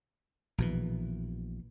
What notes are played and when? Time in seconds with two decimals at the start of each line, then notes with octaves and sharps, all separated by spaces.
0.58 A#1 B2 E3